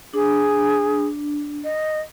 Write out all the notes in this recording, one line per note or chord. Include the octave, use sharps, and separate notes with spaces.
D4 G#4
D#5